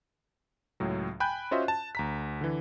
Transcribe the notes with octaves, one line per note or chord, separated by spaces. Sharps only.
C#2 A2 F#3
G5 G#5 B5 F#6 G6
C#4 F4 F#4 C5 D#5 E5
A5
D2 A#5 B6
D3 E3